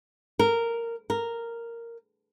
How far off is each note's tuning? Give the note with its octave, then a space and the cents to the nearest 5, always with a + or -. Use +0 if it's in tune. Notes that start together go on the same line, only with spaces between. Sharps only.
A#4 -10
A#4 -5